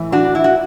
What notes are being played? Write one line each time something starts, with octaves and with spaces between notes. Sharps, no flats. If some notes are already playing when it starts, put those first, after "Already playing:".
Already playing: A2 E3
D4 F#4
E4
F#4